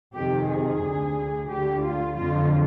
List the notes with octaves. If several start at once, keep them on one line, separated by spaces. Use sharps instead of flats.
F2 C3 D#3 G4
G#4
D2 D3
D2 D3 G4
F4
F2 D3 F4